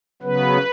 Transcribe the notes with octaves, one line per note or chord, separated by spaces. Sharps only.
C#3 F#3 B3 B4